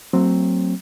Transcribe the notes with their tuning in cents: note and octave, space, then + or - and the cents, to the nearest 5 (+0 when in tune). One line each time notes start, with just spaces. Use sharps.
F#3 +0 A3 +45 C4 +10